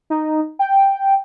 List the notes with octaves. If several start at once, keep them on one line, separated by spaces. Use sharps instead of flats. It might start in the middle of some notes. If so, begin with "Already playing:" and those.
D#4
G5